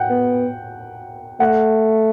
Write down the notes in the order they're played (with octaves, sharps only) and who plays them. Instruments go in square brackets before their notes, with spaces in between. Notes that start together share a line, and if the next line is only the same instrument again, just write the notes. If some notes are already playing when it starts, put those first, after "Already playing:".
Already playing: [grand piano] F#5 G5
[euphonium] B3
[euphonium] A3 [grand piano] F#5